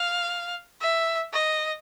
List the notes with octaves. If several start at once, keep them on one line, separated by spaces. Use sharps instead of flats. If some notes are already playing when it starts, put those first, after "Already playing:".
Already playing: F5
E5
D#5